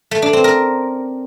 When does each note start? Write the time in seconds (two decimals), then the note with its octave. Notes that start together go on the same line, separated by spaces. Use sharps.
0.11 A3
0.22 D4
0.33 C4
0.44 A#4